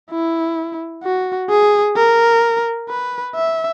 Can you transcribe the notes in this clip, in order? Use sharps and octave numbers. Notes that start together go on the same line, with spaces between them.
E4
F#4
G#4
A#4
B4
E5